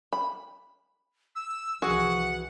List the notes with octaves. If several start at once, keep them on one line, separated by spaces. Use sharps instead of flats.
B5
E6
C2 E3 F3 F#4 G#4 F#5